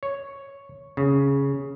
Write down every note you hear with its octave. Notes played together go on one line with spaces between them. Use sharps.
C#5
C#3